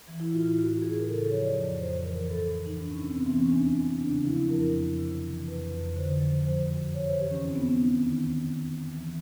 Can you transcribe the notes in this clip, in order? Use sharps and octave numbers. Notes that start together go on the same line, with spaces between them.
E3
E4
A2 F4
F4
E3 F#4
A2 G#4
A#4
C#3 A4
A4
F3 C#5
D5
F2 D5
F2 C5
E3 A#4
G2 A4
E3
D#4
G2 D4
C#4
C3 C4
B3
E3 C4
C#4
E2 D4
E2
C#3 D4
F3 E4
F2 A#4
F2
C3
E3
F2 B4
F2
D3 C5
F3 C5
F#2 C5
F#2
C3 C#5
C5
E3 G4
C#4
E2 C4
B3
E2 C#4
D#4
D#3
D#2
D#3
D#2
E3